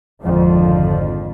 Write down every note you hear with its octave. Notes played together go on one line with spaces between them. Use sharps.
G#1 F2 D3 F3